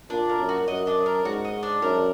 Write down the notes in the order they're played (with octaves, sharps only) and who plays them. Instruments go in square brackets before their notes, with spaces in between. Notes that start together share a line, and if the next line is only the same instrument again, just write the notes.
[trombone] A#2 [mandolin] D4
[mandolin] A#4
[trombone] F#2
[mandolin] F#4
[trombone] F#2 [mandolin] D#5
[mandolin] D4
A#4
[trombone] G#2 [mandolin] F#4
[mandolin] D#5
D4
[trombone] F#2 [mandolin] A#4